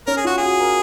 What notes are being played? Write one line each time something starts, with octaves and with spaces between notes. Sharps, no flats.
C#4 A#4
G#4
F4 F#4
F#4 G#4
A#4